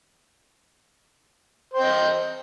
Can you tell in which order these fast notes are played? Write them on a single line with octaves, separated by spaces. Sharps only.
C5 G5 D#5